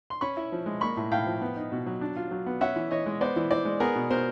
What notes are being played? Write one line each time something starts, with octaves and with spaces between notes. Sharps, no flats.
C6
C#4 B5 C#6
E4
F3
G#3
A#3 B5 C#6
A2
A2 F5 G5
F3
B3
D#4
B2
F#3
D4
F4
F#3
B3
C#4 E5 F#5
E3
E3 C#5 D#5
G#3
B3 C5 D5
E3
E3 C5 D5
G#3
B3 G#4 A#4
B2
B2 A#4 C5